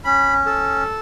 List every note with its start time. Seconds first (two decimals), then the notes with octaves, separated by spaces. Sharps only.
0.05 C#4 B5
0.46 A4